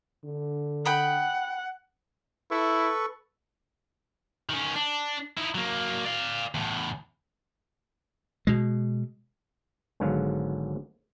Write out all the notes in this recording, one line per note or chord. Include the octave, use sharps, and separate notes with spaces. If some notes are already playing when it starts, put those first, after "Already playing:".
D3
F#5 G5 B5 D#6
E4 A4 B4 C#6
D#3 C#4
D4
D#4 E4
F#3 A#3
D5 F5
E2 A2
B2 G#3
G#1 G#2 D3 F#3 B3 F5